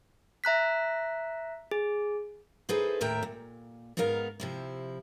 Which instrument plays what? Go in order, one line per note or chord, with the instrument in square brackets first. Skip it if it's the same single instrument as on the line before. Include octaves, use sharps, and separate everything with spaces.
[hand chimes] E5 A#5 F#6 B6
G#4
[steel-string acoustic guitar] D#4 E4 G#4 A4 B4 C5
D#2 A2 A#4 E5 G5 A#5
A#2
G#2 B3 D#4 A#4 F5
C3 F3 E4